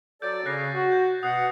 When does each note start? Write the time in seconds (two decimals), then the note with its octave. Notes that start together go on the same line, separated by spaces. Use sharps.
0.22 F#3 A4 D5 G6 A6
0.46 C#3 C#4 F#6 A#6 C7
0.74 F#4
0.92 G6
1.23 B2 F#5 D#6 C7